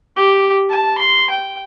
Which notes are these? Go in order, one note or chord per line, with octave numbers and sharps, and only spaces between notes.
G4
A5
C6
G5